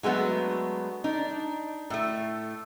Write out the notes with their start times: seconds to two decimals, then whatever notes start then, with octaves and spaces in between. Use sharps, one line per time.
0.03 F#3 G#3 A3 B3 D4
1.04 D4 D#4
1.90 A2 A3